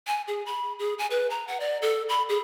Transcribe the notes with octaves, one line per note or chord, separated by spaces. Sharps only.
G#5
G#4
B5
G#4
G#5
B4
A#5
F#5
D5
A4
B5
G#4